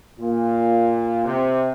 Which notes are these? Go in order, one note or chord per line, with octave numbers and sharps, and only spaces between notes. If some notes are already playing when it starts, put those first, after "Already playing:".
A#2
C3